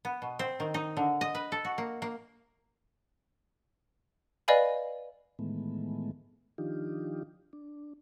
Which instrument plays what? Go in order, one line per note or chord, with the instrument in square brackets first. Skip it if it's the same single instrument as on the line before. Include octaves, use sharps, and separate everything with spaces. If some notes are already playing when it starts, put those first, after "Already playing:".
[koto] B3
B2
C4
D#3
D#4
D3
D#5
B4
A4
F#4
A#3
A#3
[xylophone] B4 D5 D#5 F5 G#5 B5
[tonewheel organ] A2 D#3 E3 G#3 A3 B3
D#3 F3 D4 D#4 F4 G4
D4